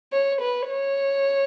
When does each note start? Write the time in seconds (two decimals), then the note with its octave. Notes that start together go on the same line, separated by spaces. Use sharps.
0.12 C#5
0.40 B4
0.70 C#5